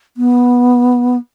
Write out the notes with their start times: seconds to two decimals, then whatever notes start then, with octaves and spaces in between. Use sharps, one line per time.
0.17 B3